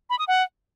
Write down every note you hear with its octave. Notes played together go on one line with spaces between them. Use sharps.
B5
D#6
F#5